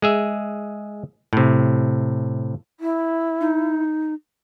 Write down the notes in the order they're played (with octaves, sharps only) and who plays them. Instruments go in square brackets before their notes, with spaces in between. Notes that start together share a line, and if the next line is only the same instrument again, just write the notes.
[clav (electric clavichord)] G#3 G#4 E5
A2 C3
[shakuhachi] E4
[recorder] D#4